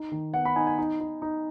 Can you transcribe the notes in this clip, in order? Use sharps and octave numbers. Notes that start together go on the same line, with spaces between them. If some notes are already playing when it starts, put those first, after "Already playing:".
Already playing: D#4
D#3
B3 F#5
B5
D#4 G#5
G#5
D#4
D#4
D#4